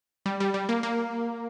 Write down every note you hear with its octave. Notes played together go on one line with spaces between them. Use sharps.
G3
G3
G3
A#3
A#3